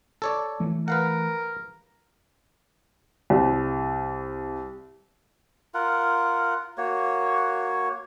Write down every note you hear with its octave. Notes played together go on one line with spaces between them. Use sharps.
A4 C#5 D5
E3 A3
A#4 B4 F5 F#5
C2
F4 A#4 F#5
A#3 F#4 C#5